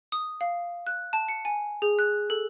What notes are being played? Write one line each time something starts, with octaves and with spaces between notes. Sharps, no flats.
D#6
F5
F#6
A5
C#7
G#5
G#4
F#6
A4